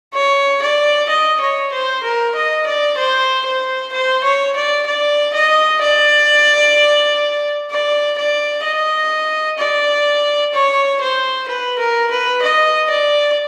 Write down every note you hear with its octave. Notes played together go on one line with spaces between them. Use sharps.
C#5
D5
D#5
C#5
C5
A#4
D#5
D5
C5
C5
C5
C#5
D5
D5
D#5
D5
D5
D5
D#5
D5
C#5
C5
B4
A#4
B4
D#5
D5